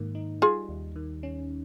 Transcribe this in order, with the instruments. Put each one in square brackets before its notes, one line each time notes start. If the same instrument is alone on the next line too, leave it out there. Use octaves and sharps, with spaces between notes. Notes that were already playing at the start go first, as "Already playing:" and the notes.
Already playing: [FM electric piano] G#2 D#3 A#3
D#4
[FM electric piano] G3 [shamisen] F4 G#4
[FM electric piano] D#2
D#3
C#4